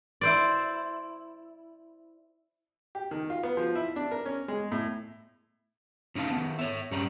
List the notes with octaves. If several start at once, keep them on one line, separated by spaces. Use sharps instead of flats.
E4 C5 D5
G4
D#3
F4
B3
F3
E4
D4
A#4
C#4
G#3
A2
A2 C#4 D#4 G4 F5 A5
D#3 B3
C#5 E5
G2 G3 C#4 D5 A#5